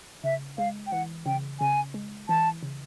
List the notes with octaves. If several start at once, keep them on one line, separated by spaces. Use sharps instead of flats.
C#3 E5
G#3 F5
G5
E3 F#5
C#3 G5
C#3 G#5
G#3
E3 A5
C#3